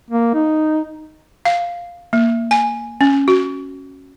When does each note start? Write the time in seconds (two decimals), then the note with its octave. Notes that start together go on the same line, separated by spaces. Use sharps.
0.10 A#3
0.34 D#4
1.45 F5
2.13 A#3
2.51 G#5
3.01 C#4
3.28 F#4